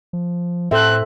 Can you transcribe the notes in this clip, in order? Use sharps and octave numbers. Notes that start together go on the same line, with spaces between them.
F3
A2 C4 A4 C5 E5 F#6